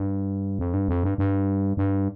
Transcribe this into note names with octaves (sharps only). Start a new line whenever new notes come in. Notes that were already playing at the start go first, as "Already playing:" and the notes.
Already playing: G2
F2
G2
F2
G2
G2
G2